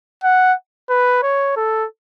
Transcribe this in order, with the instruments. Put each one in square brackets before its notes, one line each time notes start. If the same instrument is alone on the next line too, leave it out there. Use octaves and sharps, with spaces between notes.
[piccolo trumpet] F#5
B4
C#5
A4